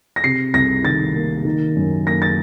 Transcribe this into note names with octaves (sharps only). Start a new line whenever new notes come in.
A#6
C3 C7
C2 A#6
D#3 A6
A#3
D#3
F#2
A#3 A#6
A6